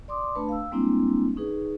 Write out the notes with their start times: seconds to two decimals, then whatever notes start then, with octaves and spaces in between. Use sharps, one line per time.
0.08 D5 C6 D6 D#6
0.35 A3 D4 B4 A5 B5
0.49 F5 E6
0.71 G3 G#3 A#3 C4 D4 E4
1.36 C#4 D#4 G#4 B4